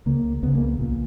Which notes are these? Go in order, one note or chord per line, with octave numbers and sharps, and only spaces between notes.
C#2 C#3 A#3
C#2 C#3 B3
A#3
A#1 A#2